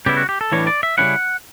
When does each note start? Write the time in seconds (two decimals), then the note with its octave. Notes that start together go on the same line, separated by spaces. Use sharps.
0.06 C#3 G3 B3 E4 G4
0.17 F#4
0.29 G4
0.41 A4
0.52 A2 E3 G3 D4 C#5
0.67 D5
0.83 E5
0.98 C#3 E3 G3 C#4 E4 F#5